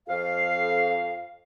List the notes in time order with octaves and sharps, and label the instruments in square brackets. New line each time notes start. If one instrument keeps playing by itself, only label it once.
[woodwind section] F2 F5